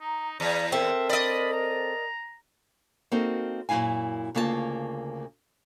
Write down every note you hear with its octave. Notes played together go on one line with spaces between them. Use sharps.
D#4 A#5
E2 D5 A#5
C4 A4 A#4 E5
D5 D#5 B5
A#5
A#3 C4 D#4 F#4 A4 A#4
F#2 A#2 C4 E4 F5 G#5
D2 C#3 A#3 F4 A#4 A5